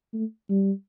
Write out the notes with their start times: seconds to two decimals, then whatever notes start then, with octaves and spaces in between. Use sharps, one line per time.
0.14 A3
0.50 G3